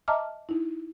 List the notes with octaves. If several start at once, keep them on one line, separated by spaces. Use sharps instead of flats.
D#5 E5 A5 A#5 D6 F6
D#4 E4